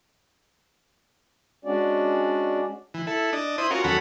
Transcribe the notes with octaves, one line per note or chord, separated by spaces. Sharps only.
G#3 C#4 D4 F#4 D5
E3
E4 A4
D4 D#5
E4 C5 D#6
C#4 F4 F#4 A#4
D#2 F#3 C#4 A4 F#5 B5